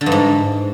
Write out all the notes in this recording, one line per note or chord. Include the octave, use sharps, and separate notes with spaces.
D3
G2
G#2